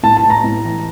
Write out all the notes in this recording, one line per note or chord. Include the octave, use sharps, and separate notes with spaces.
A2 A5
A5
A2
A#5
A2
E3